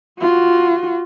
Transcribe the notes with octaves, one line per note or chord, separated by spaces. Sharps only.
F4 F#4